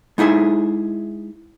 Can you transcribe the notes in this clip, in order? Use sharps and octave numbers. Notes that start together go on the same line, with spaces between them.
G#3 D#4 E4 G#4 E5